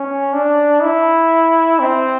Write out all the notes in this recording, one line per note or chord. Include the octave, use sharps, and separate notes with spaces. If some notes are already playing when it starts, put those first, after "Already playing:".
Already playing: C#4
D4
E4
C4